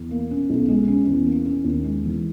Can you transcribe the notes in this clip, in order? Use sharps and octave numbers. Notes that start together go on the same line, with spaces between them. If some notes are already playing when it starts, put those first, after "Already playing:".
Already playing: E2
A#3
C#4
B1
G#3
C#4
E2
A#3
C#4
D#2
G#3
E3